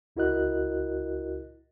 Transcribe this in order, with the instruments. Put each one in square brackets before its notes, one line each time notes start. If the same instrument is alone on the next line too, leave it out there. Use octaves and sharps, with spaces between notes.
[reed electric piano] C#2 E4 F#4 A#4 D#5 F#6